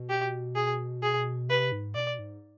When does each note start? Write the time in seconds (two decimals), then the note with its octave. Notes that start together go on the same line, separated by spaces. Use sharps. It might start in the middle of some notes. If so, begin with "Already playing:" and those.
Already playing: B2
0.09 G4
0.55 G#4
1.03 G#4
1.49 C3 B4
1.72 G#2
1.95 B2 D5
2.19 G#2